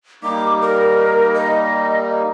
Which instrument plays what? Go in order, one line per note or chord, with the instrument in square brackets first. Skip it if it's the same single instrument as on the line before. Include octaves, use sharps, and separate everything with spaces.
[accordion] G3 A#3 D#4 [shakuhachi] D6
[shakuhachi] A#4
D#5